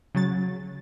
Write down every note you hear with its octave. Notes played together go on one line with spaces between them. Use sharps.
C#3 F#3 A6